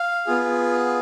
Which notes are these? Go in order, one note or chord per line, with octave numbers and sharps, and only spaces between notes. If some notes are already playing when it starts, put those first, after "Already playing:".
Already playing: F5
B3 F4 G#4